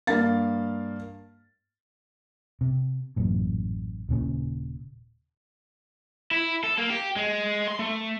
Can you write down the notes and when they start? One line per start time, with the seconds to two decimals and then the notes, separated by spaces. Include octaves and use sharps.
0.07 G2 A#3 F5 A6
2.61 C3
3.16 A1 F#2 A#2
4.09 D#1 A#2 C#3
6.31 E4
6.63 A4
6.78 A#3
6.90 G4
7.16 G#3
7.68 C6
7.79 A3